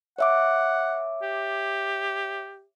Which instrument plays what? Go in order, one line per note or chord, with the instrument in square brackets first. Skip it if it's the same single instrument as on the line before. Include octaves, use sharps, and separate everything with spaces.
[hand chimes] C#5 E5 D6 [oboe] F#5
[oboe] G4